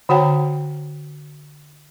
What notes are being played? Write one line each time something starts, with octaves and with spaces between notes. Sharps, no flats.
D3 F#4 C#5 F#5 G5 A#5